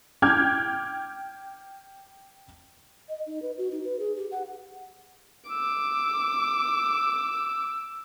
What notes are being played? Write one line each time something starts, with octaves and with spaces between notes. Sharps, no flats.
G5 D6 F6 G6 G#6
D#5
D#4
B4
F#4
D#4
B4
G#4
G4
F#5
D6 E6